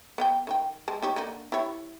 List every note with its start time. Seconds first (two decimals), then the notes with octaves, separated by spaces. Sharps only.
0.18 B3 F5 G5
0.47 D#3 E4 G5
0.88 G#3 A5
1.02 D#4 G4 C#5
1.16 D3 A#3 D#4
1.52 E4 G4 C#5